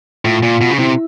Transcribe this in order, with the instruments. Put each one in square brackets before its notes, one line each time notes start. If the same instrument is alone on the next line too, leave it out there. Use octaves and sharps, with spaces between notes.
[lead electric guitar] A2 [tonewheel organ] F4
[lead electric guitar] A#2
B2
C#3
[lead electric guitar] C3 [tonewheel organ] E4